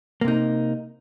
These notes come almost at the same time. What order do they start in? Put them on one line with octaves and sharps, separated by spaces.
A#3 C3 D#4